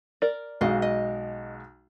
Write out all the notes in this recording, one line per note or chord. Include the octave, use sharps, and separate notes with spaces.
A#4 D5
B1 G#3 F#4 D#5 F5
D#5